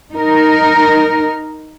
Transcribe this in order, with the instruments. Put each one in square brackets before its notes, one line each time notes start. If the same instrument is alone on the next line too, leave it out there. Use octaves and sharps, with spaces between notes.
[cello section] D#4 A#4